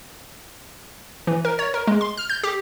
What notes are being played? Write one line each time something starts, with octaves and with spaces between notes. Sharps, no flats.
E3
A#4
C#5
A#4
G#3
C6
F6
G6
G4